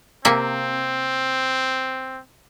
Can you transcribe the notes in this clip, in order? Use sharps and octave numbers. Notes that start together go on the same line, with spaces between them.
C3 A#3 C4 E5